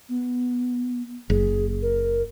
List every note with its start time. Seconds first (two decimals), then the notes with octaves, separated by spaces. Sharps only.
0.09 B3
1.30 F#1 G#4
1.82 A#4